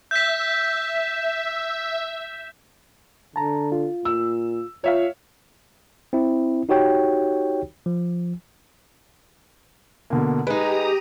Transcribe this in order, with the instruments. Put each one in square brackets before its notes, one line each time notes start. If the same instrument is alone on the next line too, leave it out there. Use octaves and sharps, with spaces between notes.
[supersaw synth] E5 [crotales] G6 B6
[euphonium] D3 [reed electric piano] A5 A#5
[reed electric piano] F4
[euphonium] A#2 [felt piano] E6
[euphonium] F4 [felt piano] C#5 E5 F5
[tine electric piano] C4 E4
D#4 F#4 G4 C#5 G5
F3
[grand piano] B2 D3 A#3
[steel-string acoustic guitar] G#3 D#4 [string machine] G4 A#5 D#6 [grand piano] B4